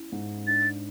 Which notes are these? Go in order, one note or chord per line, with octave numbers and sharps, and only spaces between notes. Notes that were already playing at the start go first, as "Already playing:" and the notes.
Already playing: C#4 E4
G#2
D4 A6